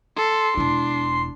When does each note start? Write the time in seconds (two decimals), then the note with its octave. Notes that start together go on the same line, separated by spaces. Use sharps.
0.16 A4 C6
0.57 E1 D4 E4